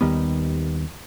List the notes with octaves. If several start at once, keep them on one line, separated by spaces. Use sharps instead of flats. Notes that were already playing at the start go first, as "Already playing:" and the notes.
D#2 D#3 G3 B3